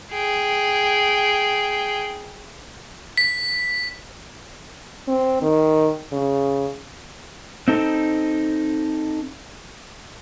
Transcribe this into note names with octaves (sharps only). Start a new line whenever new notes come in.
G#4 G5
B6
C4
D#3
C#3
C4 D#4 A4